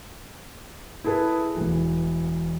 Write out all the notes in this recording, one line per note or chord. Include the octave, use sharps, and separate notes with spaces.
E4 G#4 A4 B4
E1 E3